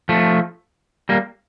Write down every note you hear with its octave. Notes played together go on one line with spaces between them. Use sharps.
F3 A3
G3 A#3